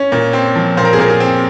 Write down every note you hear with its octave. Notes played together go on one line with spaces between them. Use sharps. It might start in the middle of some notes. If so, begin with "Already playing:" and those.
Already playing: C#4
A#2
C4
F3
A#2 C5
A#4
G#4
A#2 A#4
G#4
C4